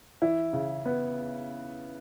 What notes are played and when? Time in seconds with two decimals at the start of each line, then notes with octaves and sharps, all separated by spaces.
0.22 E3 E4
0.53 C#3
0.85 B3